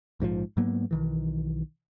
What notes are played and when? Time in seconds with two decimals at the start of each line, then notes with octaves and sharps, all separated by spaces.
0.20 A#1 G#2 C3 F3
0.57 G#2 F#3 A#3 B3
0.91 B1 D#3 E3